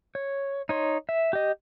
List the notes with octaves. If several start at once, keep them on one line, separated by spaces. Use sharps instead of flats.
C#5
D#4 C#5 C6
E5
G4 D#5